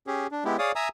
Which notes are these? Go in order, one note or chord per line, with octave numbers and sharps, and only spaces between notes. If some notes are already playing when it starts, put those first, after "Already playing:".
C#4 G4 G#4
D4
G#3 B3 E4 G4
G#4 C#5 D5 F5 D#6
E5 G#5 A#5 D#6 E6